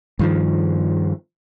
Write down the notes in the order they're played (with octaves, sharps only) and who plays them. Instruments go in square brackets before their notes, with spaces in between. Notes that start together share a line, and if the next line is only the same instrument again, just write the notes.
[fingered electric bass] G2 D#3 F3